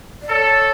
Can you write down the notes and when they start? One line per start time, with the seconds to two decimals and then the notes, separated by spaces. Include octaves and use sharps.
0.22 D5
0.29 A4 C#5